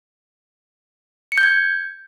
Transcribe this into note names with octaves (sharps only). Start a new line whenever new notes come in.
C#7
G6
G#6